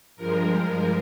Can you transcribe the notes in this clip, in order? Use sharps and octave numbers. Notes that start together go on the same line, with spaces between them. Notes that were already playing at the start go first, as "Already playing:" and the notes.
G2 F3 G#3 A#4